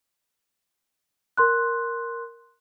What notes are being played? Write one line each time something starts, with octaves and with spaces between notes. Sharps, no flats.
A#4 C6 F#6